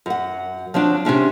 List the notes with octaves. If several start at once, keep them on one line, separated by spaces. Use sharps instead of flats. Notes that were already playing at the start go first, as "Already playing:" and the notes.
F#2 F#5
F3 F#3 C4 D4
C3 A#3 C#4 D4